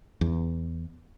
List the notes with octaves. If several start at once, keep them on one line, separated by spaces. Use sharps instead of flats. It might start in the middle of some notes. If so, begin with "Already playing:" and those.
E2